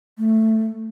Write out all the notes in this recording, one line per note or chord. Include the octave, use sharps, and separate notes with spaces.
A3